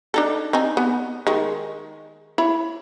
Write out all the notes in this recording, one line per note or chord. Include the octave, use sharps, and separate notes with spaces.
D4 D#4 A4
C4 D#4 G#5
B3
D#3 G#3
E4 C#5 B5